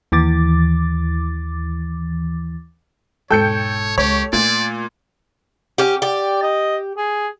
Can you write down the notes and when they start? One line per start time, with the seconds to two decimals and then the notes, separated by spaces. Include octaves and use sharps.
0.12 D#2 E3 D6 A6
3.30 E1 G#2 A4 C#5 G5 G6 C#7
3.98 C#2 G4 C#5
4.33 A#2 A3 D5
5.78 C#4 G4
6.02 G4 D5
6.42 D#5
6.97 G#4